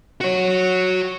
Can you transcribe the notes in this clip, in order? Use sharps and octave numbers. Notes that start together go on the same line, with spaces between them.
F#4 C#5